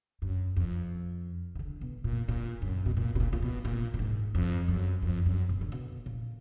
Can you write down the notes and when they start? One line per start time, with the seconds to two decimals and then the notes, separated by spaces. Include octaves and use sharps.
0.22 F#2
0.57 F2
1.55 D#3
1.59 D3
1.81 B2
2.04 A#2
2.28 A#2
2.62 F#2
2.86 B2
2.97 A#2
3.16 B2
3.20 A#2
3.33 A#2
3.43 B2
3.65 A#2
3.94 A#2
3.99 G#2
4.35 F2
4.68 F#2
5.02 F2
5.26 F#2
5.49 A#2
5.61 D3
5.72 B2
6.06 A#2